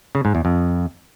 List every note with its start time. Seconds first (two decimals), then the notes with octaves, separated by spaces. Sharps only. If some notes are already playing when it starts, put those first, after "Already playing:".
0.15 C#3
0.25 G#2
0.35 E2
0.45 F2